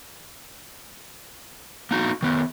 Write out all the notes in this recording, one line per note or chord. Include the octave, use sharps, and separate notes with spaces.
A#3 D#4 F#4
D#3 B3